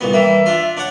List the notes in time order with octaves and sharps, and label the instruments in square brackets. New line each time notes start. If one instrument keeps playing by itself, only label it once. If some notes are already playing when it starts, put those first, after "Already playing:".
[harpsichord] C2 A#2 B3
[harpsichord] E3 G3 A#3 [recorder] E5
[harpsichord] D4 F4
D4 C#5 F#5